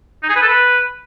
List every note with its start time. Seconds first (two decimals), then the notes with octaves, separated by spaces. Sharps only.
0.23 D#4
0.29 G#4
0.35 B4
0.42 A4
0.48 B4